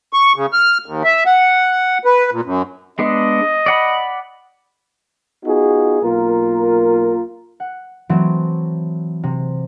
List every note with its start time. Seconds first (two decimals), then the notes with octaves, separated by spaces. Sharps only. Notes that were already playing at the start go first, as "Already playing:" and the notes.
0.13 C#6
0.36 C#3
0.53 F6
0.86 D#2
1.04 E5
1.26 F#5
2.05 B4
2.31 A#2
2.45 F#2
2.99 G#3 B3 D4 D#5
3.66 D5 F#5 B5
5.45 B3 D#4 F4 F#4 G#4
6.02 B1 A#3 F4 A#4
7.60 F#5
8.09 E3 F#3 A3 C4
9.23 C3